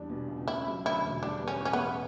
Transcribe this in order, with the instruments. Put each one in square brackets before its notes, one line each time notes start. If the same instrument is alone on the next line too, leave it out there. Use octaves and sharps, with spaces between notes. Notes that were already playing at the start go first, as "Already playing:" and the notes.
Already playing: [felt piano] E2 G3 D4
B2
C#2
[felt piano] C#3 [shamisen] E4
[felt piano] F#3
[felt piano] D2 [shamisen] E4
[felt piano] E1
[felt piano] G3 [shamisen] D4
[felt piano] B3
[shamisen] C#4
[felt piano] A2
[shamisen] C#4
B3
[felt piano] A1